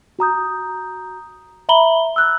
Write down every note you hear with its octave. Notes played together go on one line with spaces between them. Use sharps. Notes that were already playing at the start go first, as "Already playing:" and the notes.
F#4 A#5 D#6 G6
E5 A#5 B5 F#7 G7
E6 F#6